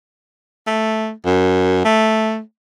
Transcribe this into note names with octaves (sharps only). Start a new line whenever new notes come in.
A3
F#2
A3